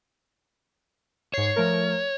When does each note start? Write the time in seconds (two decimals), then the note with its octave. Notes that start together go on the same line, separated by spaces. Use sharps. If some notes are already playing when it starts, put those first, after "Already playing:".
1.34 G#2 C#5 C7
1.56 F3 A3 A#4